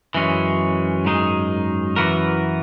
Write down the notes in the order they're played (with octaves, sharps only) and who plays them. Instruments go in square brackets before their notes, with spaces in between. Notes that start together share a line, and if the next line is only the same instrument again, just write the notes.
[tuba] F#2 [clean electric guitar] E3 G#3 C#4
[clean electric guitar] G#2 D#3 G#3 D#4 G#4
E3 B3 F#4 A#4